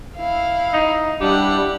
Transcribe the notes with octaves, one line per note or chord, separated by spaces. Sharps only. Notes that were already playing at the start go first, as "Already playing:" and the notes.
E4 F5
D#4
G3 D4 E4 G4 F#5